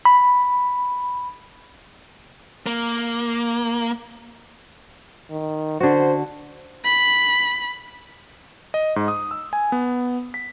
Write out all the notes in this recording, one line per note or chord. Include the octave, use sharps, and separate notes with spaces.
B5
A#3
D#3
D3 F#4 C5
B5
D#5
G#2
D#6
E6
G#5
B3
B6